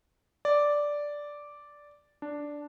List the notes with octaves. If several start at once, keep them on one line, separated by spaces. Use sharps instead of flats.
D5
D4